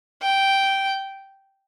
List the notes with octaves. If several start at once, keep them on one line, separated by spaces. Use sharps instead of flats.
G5